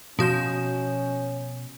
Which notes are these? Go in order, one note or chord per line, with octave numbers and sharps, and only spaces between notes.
B2 F3 C#4 F#4 F5 C6 G6